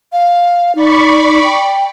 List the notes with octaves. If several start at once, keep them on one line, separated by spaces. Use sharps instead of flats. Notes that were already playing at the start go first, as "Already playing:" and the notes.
F5
D#4 D5 B5 C#6
G5